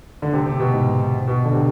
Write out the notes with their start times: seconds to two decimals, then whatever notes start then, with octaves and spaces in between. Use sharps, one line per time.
0.22 D3
0.33 C3
0.46 C3
0.60 B2
0.73 G#2
1.27 B2
1.45 D3
1.53 C3